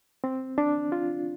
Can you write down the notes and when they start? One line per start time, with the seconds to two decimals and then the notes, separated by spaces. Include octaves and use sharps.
0.24 C4
0.58 D4
0.92 F4